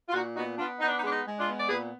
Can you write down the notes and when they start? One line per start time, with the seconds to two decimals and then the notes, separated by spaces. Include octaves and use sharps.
0.09 F4
0.13 A#2 D#4 F#4
0.36 B3 D#4 F#4
0.58 B3 D4 F4
0.80 B3 D#4
0.88 D4
0.98 D#4
1.02 G#3 D4
1.10 D#4
1.24 G#3
1.39 D4 F4
1.48 B3
1.58 D5
1.69 A#2 G#4 B4